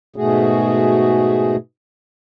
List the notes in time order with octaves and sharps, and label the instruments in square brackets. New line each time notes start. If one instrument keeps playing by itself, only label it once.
[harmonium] G#2 B2 A3 F#4 G#4